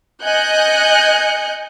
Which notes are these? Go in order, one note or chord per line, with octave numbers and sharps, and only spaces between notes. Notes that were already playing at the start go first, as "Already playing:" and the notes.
D#5 G#5 F#6 G6 C#7